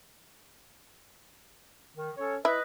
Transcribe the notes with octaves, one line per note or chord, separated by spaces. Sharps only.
D#3
C#4 A4 C#5
E4 B4 D#5